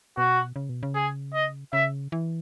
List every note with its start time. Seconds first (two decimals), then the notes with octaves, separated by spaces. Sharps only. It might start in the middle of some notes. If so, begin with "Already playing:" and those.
0.18 B2 F#4
0.56 C#3
0.69 B2
0.83 C#3
0.95 G#4
1.34 D#5
1.73 C#3 E5
2.12 E3